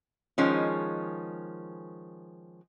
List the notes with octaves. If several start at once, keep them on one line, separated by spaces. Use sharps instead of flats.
D#3 F3 G#3 C#4